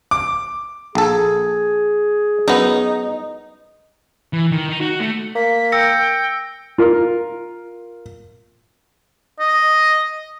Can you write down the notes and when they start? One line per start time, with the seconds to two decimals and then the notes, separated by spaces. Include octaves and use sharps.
0.11 D6
0.95 A#1 G#4 A4
2.48 F#2 B3 D#4
4.33 E3
4.51 D#3
4.69 D#4
4.81 F#4
5.00 A3
5.35 A#3 B6
5.72 G5 E6 A#6 C#7
6.78 F4 A#4
9.40 D#5